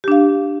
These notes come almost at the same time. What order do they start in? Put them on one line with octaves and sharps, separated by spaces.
G4 D4 F5